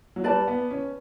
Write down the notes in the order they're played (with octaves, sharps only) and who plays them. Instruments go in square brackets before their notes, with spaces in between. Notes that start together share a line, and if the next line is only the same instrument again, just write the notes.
[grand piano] F#3
[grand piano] G3 [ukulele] B4 D5 A5
[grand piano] B3
C#4